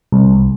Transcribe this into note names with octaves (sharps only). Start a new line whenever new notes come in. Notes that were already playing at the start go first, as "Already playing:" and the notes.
C2